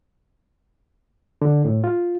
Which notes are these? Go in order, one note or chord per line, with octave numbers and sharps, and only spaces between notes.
D3
A2
F4